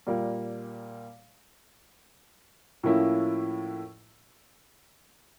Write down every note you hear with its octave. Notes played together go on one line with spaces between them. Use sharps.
A#2 G3 A#3
A2 F3 A#3 C#4 E4